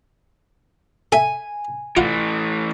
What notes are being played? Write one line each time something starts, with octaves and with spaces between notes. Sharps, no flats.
A4 E5 G#5
E3 A3 F4 F5 F#5